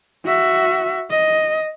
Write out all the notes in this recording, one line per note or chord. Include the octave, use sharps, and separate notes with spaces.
F#4 E5
D#5